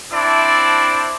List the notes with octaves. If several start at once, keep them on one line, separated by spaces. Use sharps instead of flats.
C4 D4 E4 D5 A5